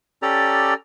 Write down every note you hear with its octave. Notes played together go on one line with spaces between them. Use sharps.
C#4 G4 A4 D5 A#5